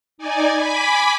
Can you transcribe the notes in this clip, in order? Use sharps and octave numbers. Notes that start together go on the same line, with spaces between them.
D#4 D5 G#5
G#5 B5 D6 B6